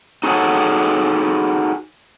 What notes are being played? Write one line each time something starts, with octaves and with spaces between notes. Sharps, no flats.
D#4 F#4 G#4 A4 C#5 F#5